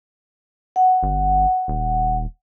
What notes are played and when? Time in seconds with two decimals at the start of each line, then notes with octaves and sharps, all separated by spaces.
0.76 F#5
1.03 G1
1.68 D#1